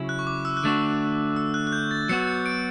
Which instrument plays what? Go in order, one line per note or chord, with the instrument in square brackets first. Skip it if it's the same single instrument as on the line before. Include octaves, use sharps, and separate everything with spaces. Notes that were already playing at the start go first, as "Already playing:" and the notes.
Already playing: [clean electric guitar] C#3 F#3 C#4 E4
[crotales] F#6
C#6
D6
E6
F#6
[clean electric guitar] D3 A3 D4 F#4 [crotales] E6
[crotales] E6
F#6
F#6
G6
A6
[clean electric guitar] F#3 B3 F#4 [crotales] C#7
[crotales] C#7
D7